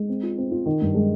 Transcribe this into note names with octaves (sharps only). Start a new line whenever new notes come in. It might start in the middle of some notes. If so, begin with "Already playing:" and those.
Already playing: G#3
C4
F4
C4
F4
D#3
G2
G#3